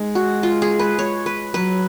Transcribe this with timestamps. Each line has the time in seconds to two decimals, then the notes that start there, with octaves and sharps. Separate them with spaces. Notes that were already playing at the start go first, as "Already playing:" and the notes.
Already playing: G#3 D#4
0.15 F#4
0.43 F4
0.62 G#4
0.79 B4
0.99 C#5
1.26 B4
1.54 F#3 B4